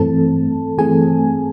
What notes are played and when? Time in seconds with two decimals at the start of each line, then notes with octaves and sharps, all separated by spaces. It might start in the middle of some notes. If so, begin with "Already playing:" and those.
Already playing: G2 E3 A3 C4 A4 A5
0.78 G2 E3 A3 C4 G#4 G#5